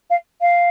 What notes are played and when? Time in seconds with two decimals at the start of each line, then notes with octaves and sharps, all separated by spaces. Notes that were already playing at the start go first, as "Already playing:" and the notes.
0.10 F5
0.41 F5